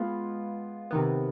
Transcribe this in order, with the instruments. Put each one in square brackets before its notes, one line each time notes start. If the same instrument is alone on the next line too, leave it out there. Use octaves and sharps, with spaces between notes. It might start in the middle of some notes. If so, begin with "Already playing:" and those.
Already playing: [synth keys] G#3 B3 F4
C3 D#3 B3